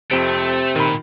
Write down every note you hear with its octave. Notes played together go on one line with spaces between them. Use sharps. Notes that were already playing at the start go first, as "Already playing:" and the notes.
F2 C3 A3 C4 D7
A#2 D#3 B5